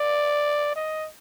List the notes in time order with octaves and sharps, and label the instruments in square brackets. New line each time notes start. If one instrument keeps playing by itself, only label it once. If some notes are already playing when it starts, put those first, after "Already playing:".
Already playing: [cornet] D5
D#5